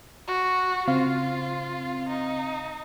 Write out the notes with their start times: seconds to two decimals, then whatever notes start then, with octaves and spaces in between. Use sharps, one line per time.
0.27 F#4
0.88 C#3 C4 F4 F5
2.08 D#4